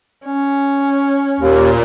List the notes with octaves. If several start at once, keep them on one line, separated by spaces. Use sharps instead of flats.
C#4
D#2 A#2